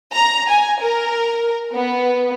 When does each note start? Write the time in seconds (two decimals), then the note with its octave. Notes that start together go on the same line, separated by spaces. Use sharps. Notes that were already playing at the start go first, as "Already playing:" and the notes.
0.13 A#5
0.49 G#5
0.81 A#4
1.74 B3